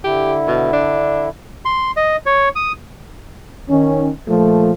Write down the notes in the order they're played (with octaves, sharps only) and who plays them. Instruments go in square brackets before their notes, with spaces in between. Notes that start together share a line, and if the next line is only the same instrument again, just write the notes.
[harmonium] D3 E4 [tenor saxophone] G4
[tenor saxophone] B2
D4
[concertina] C6
D#5
C#5
D#6
[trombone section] D#3 C#4
A#2 F3 A3